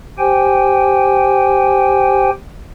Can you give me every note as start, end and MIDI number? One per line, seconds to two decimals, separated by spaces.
0.19 2.30 67
0.19 2.30 72
0.19 2.30 79
0.19 2.30 80